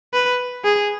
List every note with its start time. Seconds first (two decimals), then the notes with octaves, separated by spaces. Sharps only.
0.13 B4
0.64 G#4